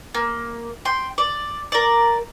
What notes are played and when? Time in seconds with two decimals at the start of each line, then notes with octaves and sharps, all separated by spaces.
0.14 A#3
0.85 G5 C6
1.18 D5
1.72 A#4 D5